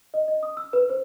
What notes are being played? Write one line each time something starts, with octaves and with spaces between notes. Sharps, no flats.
D#5
D#5
D#6
E6
B4
C5